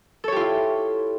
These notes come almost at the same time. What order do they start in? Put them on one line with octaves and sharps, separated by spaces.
A4 C#5 G4 F4 E4